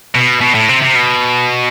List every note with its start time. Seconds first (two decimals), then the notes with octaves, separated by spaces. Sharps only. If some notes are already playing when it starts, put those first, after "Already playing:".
0.15 B2
0.41 B2
0.55 A2
0.69 C3
0.82 C3
0.95 B2